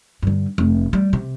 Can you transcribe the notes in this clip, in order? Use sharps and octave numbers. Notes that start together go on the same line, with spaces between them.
G2 D3
F1
G3
C3